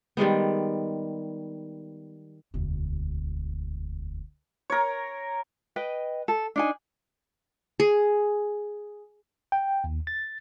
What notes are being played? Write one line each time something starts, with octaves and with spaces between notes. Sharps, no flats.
D#3 G3 G#3 B3
E1 D2
A#4 C#5
B4 D#5 G5
A4
D4 D#4 G#5
G#4
G5
D#2
A6